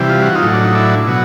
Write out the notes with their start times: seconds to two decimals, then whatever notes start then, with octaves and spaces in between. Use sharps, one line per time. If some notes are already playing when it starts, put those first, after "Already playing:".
Already playing: C3 E3 G3
0.09 F4
0.22 F#4
0.35 D#4 F4
0.43 A2 F#3
0.54 D4
0.64 D#4
0.75 D4 E4
1.07 B2 F#3